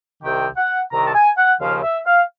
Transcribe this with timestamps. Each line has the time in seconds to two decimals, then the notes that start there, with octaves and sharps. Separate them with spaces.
0.23 C2 C3 D#3 G5
0.57 F#5
0.92 C2 C3 D#3 A#5
1.07 A5
1.15 G#5
1.38 F#5
1.61 D#2 C#3 F3 F5
1.83 E5
2.06 F5